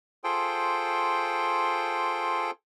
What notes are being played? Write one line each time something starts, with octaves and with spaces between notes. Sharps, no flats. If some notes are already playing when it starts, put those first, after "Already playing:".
F4 G#4 A4 C5 G5